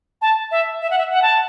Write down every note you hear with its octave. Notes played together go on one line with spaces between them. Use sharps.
A5
E5
E5
F#5
E5
F#5
A5